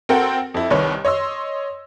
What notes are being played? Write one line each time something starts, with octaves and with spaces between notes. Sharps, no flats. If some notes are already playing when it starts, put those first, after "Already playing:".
C4 F#4 A4 A#4 F#5 G5
F2 E4
C2 D#3 B4 C#5
C#5 D#5 C6 E6